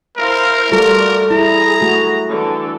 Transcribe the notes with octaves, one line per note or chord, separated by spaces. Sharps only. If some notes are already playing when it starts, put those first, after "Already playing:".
E4 A#4 C5 F5
G3 A3 F4 F#4 A4 A#4 D5
E4 G#4 A#5
A3 F#4
D3 E3 A4